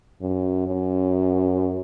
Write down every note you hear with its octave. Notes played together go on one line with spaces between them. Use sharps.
F#2
F#2